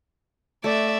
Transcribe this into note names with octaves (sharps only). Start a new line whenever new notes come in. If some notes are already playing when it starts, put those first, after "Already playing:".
A3 D5 E5